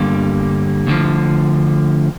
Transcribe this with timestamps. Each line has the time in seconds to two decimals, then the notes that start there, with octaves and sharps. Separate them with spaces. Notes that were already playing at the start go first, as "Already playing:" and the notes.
Already playing: G2 D3 G3 A#3
0.87 D2 D3 F3